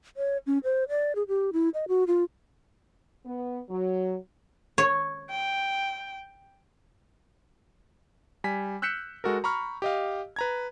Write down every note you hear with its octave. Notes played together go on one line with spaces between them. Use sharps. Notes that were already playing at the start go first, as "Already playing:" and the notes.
C#5
C#4
C5
D5
G#4
G4
E4
D#5
F#4
F4
B3
F#3
C#5
G5
G3 G#5 B6
E6 F#6 G6 B6 C#7 E7
G#3 F#4 A4 A#4
A#5 B5 C#6 F6
G4 D#5 F5
B4 A#5 G#6